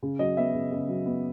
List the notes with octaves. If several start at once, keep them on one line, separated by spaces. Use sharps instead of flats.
C#3
F#3 D#5
B3 E5
C#3
C#3
F#3
B3